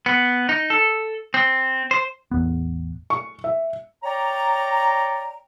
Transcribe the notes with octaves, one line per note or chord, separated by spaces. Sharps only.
B3
D#4
A4
C4
C5
A1 E2 B3
C#6
E5
C#5 D5 G5 A#5